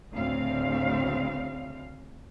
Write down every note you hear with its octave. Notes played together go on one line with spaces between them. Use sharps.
D2 A2 C#3 C4 F5